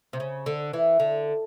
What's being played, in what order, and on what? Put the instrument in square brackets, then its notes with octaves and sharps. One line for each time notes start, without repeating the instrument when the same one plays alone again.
[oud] C3
C#3
D3
E3
D3